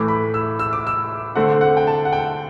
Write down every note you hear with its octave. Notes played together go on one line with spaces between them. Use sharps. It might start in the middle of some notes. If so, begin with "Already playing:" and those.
Already playing: A2 E3 A3 D6
B5
E6
E6
D6
E6
D3 A3 C4 F#5
F#5
G5
A5
F#5
G5